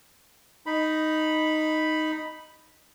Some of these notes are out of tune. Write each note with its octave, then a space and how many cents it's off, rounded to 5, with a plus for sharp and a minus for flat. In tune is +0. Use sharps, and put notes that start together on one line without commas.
D#4 +0 B5 +0